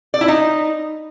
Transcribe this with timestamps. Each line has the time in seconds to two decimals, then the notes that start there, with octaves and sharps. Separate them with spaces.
0.14 D5
0.21 E4
0.28 D#4